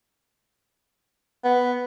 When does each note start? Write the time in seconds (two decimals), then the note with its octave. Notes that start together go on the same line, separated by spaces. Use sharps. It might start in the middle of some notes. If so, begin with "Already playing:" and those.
1.44 B3